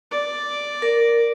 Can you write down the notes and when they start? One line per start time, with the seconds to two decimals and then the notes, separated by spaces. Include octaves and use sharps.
0.11 D5
0.82 A#4